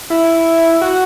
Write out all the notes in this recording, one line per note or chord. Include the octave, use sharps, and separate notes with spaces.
E4
F#4